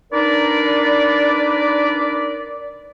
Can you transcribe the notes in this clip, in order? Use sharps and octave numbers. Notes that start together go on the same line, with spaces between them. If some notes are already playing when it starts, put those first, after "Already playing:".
D4 D#4 A#4 B4 D5